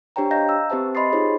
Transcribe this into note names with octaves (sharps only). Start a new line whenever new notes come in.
D4 G4 C5 C#5 G5 A#5
D#5 F5 A#5 G6 A#6
E6
C4 G4 B4 C5 E5 A5
D#5 B5 C6 D#6 A6 C7
D#4 F4 G4 G#4 C5 C#5